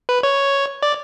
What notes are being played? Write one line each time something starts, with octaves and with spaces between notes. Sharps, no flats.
B4
C#5
D5